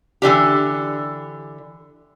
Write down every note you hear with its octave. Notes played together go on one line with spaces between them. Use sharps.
D3 E3 D4 G4